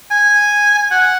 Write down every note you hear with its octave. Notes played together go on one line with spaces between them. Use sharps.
G#5
F#5